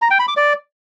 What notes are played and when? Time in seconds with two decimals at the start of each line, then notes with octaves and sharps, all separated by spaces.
0.02 A#5
0.11 G5
0.19 B5
0.28 D6
0.37 D5